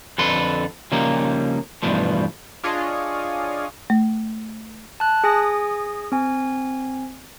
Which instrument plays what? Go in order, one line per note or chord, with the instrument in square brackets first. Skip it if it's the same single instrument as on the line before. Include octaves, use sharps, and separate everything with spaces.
[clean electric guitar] F2 D3 A4 B4 C6
C#3 F3 G3 A#3 D#4
E2 G2 B2 F3 A3
[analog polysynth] D4 F4 G#4 C#5 D#5
[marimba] A3
[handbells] A5 F#6
G#4 G#5 D#6 A#6
C4 G#5